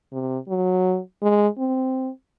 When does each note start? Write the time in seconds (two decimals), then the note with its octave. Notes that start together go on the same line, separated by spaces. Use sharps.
0.12 C3
0.48 F#3
1.22 G#3
1.58 C4